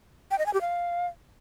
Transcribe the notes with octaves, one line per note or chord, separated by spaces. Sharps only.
G5
D#5
G#5
G4
F5